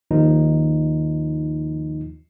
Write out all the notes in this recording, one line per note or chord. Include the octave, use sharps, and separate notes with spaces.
D#2 D#3 F3 D#4